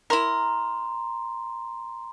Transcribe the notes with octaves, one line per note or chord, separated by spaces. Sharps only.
E4 A#4 A#5 C6